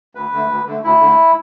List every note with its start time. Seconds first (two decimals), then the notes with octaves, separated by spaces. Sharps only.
0.15 D2 B4
0.33 D3 A3
0.49 D2
0.66 D3 A3
0.83 D2 E4
1.00 D3 A3